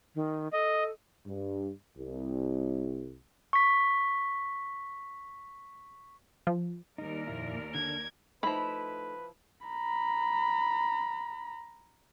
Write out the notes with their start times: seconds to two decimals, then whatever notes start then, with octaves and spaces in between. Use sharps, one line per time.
0.15 D#3
0.53 A4 D#5
1.26 G2
1.97 C2
3.53 C#6 B6
6.47 F3
6.98 D#2 G3 D#4 A#4 D5
7.27 F2 A#2 E4
7.75 D3 D4 G#6
8.43 F3 A3 D#4 E4 B4 B5
9.67 A#5 B5